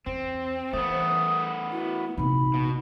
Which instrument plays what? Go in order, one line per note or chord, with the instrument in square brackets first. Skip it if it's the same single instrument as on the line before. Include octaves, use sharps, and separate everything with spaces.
[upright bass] E2 [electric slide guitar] C4 [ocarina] C5
[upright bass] E3 [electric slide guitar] A3 B3 [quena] D#6
[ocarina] E4 [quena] F#4
[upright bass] A#1 C3 [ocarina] D#4 [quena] B5
[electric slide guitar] B2